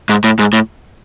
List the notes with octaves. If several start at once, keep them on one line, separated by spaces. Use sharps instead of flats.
G#2
A2
G#2
A2